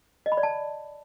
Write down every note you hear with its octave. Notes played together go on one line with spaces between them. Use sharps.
D#5
B5
D5
A5